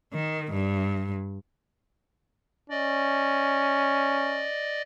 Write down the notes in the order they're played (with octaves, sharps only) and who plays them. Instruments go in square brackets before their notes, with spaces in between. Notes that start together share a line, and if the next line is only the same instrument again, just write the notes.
[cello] D#3
G2
[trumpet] C#4 [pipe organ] D5 D#5